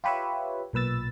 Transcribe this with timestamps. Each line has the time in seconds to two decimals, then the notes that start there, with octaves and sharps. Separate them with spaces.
0.04 F4 G4 B4 C#5 E5
0.73 B1 A#2 B4 E6 A6